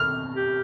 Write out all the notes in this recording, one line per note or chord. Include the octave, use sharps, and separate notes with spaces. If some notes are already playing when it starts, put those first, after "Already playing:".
Already playing: F6
G4